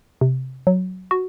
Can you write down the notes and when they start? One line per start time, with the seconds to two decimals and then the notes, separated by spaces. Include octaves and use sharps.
0.21 C3
0.67 F#3
1.11 F#4